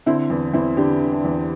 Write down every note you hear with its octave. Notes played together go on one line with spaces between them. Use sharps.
D3 C4 E4
E2
E2 C4 E4
D3 D4 G4
D3
D4
E2